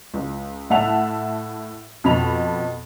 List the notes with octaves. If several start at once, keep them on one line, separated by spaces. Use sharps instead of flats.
C#2
A2 E5 F#5 A5 F7
F2 B2 A5 B5 F7